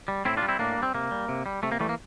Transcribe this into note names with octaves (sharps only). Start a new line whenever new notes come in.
G3
A2 C4 E4
D4 F4
G3
C4 E4
A2 A#3 D4
G3
C4
C3 A#3
G3
C3
G3
C3 A3
A#3
E3 G3 A3
A#3